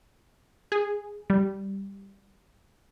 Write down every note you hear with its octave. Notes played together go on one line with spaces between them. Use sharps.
G#4
G3